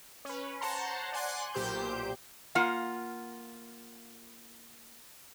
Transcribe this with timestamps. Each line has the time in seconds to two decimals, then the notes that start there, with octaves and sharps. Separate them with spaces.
0.25 C#4 B4
0.61 C5 C#5 F#5 A5 A#5 C6
1.13 D5 F#5 G#5 C6 F#6
1.54 B1 A#2 G4 C5 G6
2.55 A#3 F4 F#5